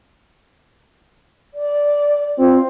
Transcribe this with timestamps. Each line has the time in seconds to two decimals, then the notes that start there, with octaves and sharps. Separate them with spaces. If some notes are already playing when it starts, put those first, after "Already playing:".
1.54 D5
2.39 C4 F4